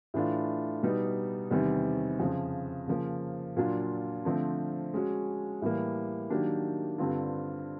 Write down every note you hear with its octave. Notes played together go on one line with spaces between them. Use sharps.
A2 E3 A3 D4 F4
B2 G3 B3 D#4
E2 C3 D#3 G3 C4
F2 C#3 F3
C#3 F3 A#3
A#2 F#3 A#3 D4 F4
D3 F3 A3 C4
G#3 C#4 F#4
A2 E3 G3 A#3
D#3 F#3 A#3 D4 G4
G2 D3 G3 C4 F4